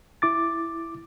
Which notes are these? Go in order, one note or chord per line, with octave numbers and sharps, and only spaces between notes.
E4 D6 A6